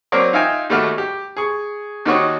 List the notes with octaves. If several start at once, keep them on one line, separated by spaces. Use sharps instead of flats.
F#3 A#3 C4 A#4 C#5 D5
D#4 F4 E5 G5 G#5
D#2 G3 A3 F#4 F6
G4
G#4 C#6
D#2 D#3 G3 F#4 C#5 D#5